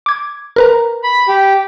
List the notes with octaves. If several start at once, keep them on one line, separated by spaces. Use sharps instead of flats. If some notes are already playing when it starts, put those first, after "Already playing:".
D6 G#6
A#4 B4 A#5
B5
G4